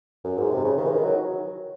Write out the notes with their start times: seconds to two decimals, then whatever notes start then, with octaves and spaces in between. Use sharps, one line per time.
0.24 F#2
0.38 G#2
0.51 C3
0.64 C#3
0.77 D#3
0.85 E3
0.91 D#3
1.03 F#3